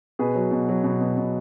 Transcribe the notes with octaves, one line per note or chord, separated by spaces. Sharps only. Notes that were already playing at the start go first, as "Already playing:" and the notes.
B2 G#4 B4
F#3
B2
F#3
B2
B2
B2